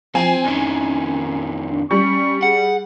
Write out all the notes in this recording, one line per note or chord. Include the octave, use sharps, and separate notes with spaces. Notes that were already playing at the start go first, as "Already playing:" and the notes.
F3 C4 G#5
F2 D#3 C#4
D4
G3 C#4 C#6
G#4 F#5